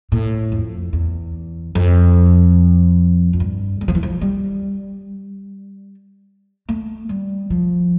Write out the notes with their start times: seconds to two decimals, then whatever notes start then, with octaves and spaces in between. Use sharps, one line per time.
0.12 A2
0.52 F2
0.93 E2
1.75 F2
3.33 F2
3.40 G2
3.81 G3
3.88 F3
3.95 E3
4.03 F3
4.21 G3
6.69 A3
7.09 G3
7.50 F3